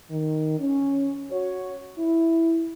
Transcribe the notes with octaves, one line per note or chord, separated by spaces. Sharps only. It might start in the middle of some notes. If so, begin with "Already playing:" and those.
D#3
C#4
F#4 C#5
E4